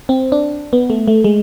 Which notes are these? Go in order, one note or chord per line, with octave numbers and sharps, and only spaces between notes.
C4
D4
B3
A3
A3
G#3